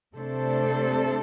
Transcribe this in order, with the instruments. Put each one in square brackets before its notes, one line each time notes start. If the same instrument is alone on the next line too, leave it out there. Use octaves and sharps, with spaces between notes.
[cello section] C3 A3 D4 A4 C5